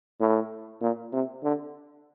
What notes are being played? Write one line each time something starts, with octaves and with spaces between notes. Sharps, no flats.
A2
A#2
C3
D3